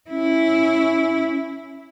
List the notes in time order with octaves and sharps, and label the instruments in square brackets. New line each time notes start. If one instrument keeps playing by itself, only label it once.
[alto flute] C#4 [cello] E4